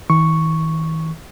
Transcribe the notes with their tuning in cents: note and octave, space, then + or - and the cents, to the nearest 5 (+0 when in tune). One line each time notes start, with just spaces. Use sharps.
E3 -45 C#6 +0